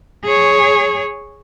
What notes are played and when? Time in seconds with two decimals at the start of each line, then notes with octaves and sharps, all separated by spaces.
0.24 G#4 C#5